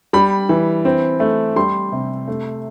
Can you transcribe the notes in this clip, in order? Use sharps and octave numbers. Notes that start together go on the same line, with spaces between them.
G3 B5
E3
C4
A3
G3 C6
C3
A3